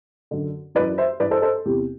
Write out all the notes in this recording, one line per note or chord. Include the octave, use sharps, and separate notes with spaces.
F#2 D3
F#2 E3 B4 D5
C5 E5
G2 E3 B4 D5
A4 C5
A4 C5
E2 C3 E3 G4